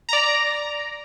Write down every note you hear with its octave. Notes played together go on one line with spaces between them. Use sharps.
D5 A#5